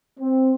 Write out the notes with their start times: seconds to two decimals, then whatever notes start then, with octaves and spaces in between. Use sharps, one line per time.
0.20 C4